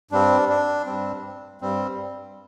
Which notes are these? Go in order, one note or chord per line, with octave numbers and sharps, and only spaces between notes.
G2 G3 C4 D4
D4
G2 G3 C4
G2 G3 C4